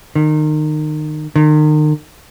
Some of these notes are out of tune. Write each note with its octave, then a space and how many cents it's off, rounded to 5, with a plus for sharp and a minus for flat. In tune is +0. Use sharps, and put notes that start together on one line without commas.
D#3 -25
D#3 -35